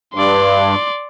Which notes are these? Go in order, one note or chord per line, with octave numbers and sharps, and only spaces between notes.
G2 D5 C6